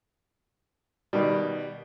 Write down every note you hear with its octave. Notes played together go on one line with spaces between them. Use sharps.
B2 D#3 G3